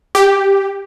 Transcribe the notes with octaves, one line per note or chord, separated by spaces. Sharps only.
G4